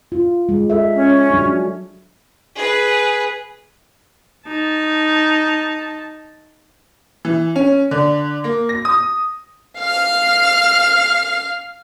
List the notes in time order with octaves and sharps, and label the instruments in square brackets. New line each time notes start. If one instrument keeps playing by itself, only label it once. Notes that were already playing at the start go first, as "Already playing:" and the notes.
[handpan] F4
G#3
A4 E5
[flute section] C#4
[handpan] F#3 D4
[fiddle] G#4 B4
[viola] D#4 A5
[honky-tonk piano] E3
C#4
D3
A#3
A#6
D#6
[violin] F5 F6